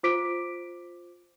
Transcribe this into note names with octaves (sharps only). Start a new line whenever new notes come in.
F4 C5 D6 B6 D7